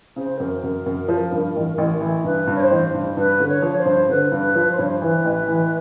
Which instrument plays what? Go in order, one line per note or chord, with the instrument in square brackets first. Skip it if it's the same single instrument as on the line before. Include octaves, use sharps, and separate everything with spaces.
[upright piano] C#3 [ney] C5
[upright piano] F#2 [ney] A#4
[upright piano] F#2
F#2
F3
G2
A1
A1
E3
[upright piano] G2 [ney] B4
[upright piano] G2
[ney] C#5
C5
[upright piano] A1
G2
[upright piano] G2 [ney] B4
[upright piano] D3
[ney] C#5
[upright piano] F3
[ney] C5
[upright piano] G2
[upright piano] D3 [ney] B4
[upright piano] G2
[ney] B4
[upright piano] F3
[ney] C5
[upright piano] G2 [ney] C#5
[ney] C5
[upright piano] E3 [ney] B4
[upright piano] A1
E3